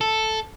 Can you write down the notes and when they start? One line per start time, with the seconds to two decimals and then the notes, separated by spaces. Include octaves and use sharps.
0.01 A4